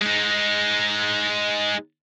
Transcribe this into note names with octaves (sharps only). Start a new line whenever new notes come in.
G#3 D#4